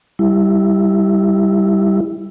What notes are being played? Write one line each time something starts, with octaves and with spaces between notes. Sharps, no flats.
G3 E4